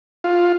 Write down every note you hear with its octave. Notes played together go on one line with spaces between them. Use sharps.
F4